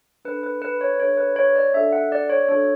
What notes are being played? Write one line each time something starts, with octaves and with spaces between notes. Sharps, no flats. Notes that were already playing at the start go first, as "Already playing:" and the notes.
D4 A4 B4
B4
B4
C#5
D4 A4 C#5
B4
C#5
D5
D4 F#4 A4 E5
F#5
D5
C#5
D4 F#4 A4 C#5